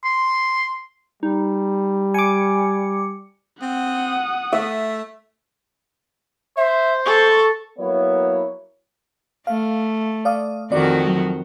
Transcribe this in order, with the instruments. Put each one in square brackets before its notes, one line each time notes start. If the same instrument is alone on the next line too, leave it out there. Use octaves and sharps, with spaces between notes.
[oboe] C6
[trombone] G3 [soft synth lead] D#4
[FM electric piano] G#5 D6 [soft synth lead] C#7
[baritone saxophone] C4 [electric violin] F#5 D#6
[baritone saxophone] A3 [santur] E5
[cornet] C5 [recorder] E5
[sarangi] A4 [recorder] C#6
[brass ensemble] F#3 A#3 B3 E4 C#5
[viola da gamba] A3 [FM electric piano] F5
[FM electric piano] D5 F5 D#6
[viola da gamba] F2 D#3 F#4 [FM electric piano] D5
[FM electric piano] F#3